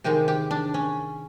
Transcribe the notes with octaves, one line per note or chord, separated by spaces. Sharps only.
C3 D#3 G#3 G4
G4
D4
C#4